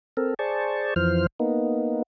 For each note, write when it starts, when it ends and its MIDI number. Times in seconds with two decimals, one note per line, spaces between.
0.17 0.34 60
0.17 0.34 69
0.17 0.34 70
0.39 0.94 68
0.39 0.94 72
0.39 0.94 74
0.39 0.94 81
0.39 0.94 85
0.96 1.27 41
0.96 1.27 52
0.96 1.27 53
0.96 1.27 72
0.96 1.27 89
1.40 2.02 58
1.40 2.02 59
1.40 2.02 63